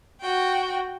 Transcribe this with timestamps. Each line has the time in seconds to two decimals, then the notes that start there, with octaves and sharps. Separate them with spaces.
0.20 F#4 G5